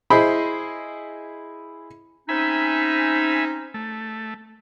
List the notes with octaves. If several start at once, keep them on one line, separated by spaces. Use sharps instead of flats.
E4 G#4 C5 D#5 B5
C4 C#4 D#4 E5 G#5 B5
A3